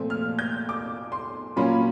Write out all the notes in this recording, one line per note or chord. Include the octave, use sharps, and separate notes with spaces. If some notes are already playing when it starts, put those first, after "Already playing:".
Already playing: A#2 F3 A3 C4
F6
G6
D6
C6
A#2 F#3 A#3 C#4 F4 B5